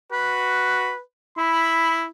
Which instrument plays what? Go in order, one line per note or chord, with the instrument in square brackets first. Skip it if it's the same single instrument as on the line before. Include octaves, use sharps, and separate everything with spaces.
[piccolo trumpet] F#4 [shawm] B4
[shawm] E4 [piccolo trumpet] B5